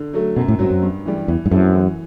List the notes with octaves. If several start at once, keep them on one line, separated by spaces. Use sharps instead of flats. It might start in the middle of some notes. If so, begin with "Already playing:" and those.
Already playing: D3
F#3 A3
F#2 B2
A2
G2 F#3 C4 F#4
F#2
G2
E3 G3
E2 E3
G2
F#2 A3 C4 E4 A4
E3